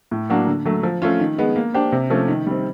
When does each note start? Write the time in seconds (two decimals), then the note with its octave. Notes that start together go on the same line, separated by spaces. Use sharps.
0.11 A2
0.30 F#3 A#3 D4 F#4
0.47 D3
0.65 F#3 A3
0.83 F3
1.02 A3 C#4 F4
1.20 D#3
1.38 G#3 B3
1.56 A#3
1.74 D4 G4 C5
1.92 C3
2.10 F3 A3 C#4
2.28 D#3
2.46 G3 C4